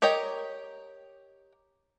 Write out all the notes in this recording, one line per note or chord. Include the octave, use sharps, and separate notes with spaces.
G4 A#4 C#5 D#5 G5